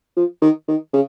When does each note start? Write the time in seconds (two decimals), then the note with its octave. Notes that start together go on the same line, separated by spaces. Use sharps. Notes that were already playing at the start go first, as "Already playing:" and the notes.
0.16 F3
0.42 D#3
0.68 D#3
0.93 C#3